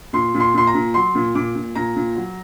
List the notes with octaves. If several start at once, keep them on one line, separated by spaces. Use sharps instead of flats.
A#2 C6
A#2
C6
A#2 C6
A#5
A#2
F#3 C6
A#2
A#2 D6
A#2
A#2 A#5
A#2
F#3